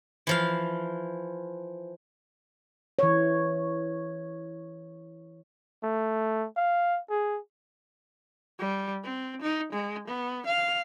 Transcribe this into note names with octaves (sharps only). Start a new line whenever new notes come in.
E3 F3 F5
E3 C#5
A3
F5
G#4
G3
C4
D#4
G#3
B3
F5